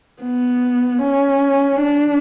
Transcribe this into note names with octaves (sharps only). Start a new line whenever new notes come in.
B3
C#4
D4